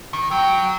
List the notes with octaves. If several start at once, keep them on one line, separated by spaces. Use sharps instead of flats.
D#3
F#3 G5